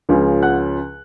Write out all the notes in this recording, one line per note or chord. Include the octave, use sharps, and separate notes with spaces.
C#2 C#3 F3
F#5 F#6